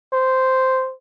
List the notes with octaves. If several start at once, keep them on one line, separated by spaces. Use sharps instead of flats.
C5